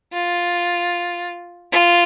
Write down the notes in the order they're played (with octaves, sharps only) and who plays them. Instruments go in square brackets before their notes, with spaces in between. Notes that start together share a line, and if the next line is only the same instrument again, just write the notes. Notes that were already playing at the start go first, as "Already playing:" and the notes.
[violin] F4
F4